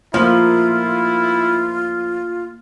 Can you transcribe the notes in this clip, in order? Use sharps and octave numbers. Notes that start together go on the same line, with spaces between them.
F3 A3 A#3 E4 F4